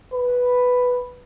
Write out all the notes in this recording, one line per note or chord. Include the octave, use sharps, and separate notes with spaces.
B4